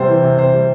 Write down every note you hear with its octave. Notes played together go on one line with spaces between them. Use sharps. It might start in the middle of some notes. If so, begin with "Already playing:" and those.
Already playing: C3 G3 C5
E3
C3
C3 C5
G3